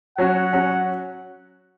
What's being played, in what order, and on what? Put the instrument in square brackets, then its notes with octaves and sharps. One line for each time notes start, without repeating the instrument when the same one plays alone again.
[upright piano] F#3 C#4 F#4 [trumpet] F#5
[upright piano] F#3 C#4 F#4